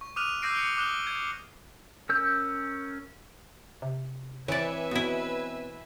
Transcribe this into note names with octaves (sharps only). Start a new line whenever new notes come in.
C#6
D6 D#6 F6 F#6 D#7 F7
D6 E6 G6 A#6 C7 D7
D6 C#7 D7 G7
D6 D#6 F#6 E7 G7
G#6
C#4 A#4 E6 G6
C3
E3 C4 B4 C#5 D5 E5 G#5
B2 B3 E4